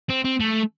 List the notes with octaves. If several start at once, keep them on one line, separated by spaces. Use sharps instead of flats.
C4
C4
A3